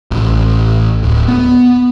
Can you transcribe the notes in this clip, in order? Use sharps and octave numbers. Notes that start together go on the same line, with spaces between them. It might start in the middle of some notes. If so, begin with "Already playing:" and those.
A1
D1
B3